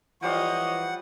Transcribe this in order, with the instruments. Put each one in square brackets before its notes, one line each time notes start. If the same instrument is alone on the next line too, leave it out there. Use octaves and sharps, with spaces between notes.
[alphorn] E3 [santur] F3 G3 F5 [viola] C#5 D#5 [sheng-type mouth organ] F#5